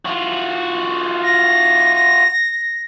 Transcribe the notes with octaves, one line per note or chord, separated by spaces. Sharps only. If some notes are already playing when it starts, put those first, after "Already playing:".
F4 F#4
A#6